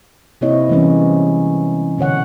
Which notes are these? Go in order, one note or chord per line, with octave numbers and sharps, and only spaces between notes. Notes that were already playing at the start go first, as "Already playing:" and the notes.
C3 A#3 C4 E4 C#5 D#5
E3 G3 G#3 B3 C#4
B2 D3 C#5 F#5